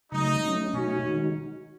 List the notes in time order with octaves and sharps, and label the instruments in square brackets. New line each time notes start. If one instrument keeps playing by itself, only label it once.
[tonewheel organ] C#3 F#3 A3 [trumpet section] D#4
[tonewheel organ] F#3 A3 C#4
[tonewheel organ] B2 A3 D#4 F#4 [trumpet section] C#4
[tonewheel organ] D#3 G#3 D#4 F#4